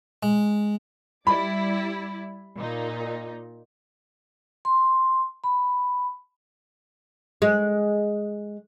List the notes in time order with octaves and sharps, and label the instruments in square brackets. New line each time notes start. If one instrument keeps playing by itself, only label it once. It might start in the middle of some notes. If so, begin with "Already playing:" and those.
[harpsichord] G#3
[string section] G3 E4 D5 [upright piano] B5
[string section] A#2 D#4
[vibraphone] C6
B5
[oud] G#3